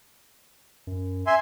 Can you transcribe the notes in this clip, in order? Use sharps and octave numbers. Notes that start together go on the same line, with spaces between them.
F#2
E5 G#5 C6